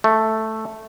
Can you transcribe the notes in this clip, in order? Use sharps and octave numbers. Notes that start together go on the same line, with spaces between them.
A3